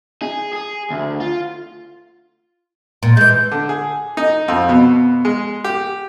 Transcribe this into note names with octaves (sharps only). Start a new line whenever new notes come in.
G#4
G#4
D2
F4
A#2
E3 G#3 G6
D3
G#4
D#4
F2
B2
G#3
G4